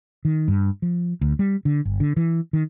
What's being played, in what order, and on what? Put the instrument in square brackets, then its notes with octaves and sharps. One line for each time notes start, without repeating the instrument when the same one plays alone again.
[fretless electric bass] D#3
G2
F3
D2
G3
D3
G1
D3
E3
D#3